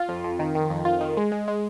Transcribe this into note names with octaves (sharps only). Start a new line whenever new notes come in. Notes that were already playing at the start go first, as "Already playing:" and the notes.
Already playing: F4
F2
F2
D#3
D#3
F2
F4
D#3
G#3
G#3
G#3